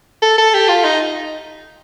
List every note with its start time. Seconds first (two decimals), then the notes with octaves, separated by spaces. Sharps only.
0.22 A4
0.38 A4
0.54 G4
0.68 F4
0.84 D#4